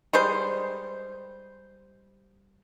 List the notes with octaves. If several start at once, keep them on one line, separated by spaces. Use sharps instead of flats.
G3 G#3 C5